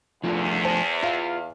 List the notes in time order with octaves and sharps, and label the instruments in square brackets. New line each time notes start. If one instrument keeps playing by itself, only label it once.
[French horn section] E2 [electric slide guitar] F3 A3 D4 [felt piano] F4
[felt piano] C5 A5
[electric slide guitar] F4 [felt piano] F5